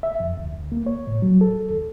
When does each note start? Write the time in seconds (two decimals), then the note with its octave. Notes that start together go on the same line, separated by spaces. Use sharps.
0.03 E5
0.20 F2
0.37 D2
0.72 A#3
0.86 C#5
1.07 A2
1.22 F#3
1.41 A4
1.70 D#2